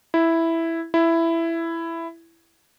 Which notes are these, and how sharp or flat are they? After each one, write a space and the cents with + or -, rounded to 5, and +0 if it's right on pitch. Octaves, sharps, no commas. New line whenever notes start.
E4 +0
E4 +10